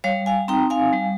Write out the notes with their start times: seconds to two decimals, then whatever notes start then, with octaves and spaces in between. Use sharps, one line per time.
0.04 G3 C#5 F5
0.26 F5 G#5
0.48 C4 D#4 G5 A#5
0.70 F5 G#5
0.93 G3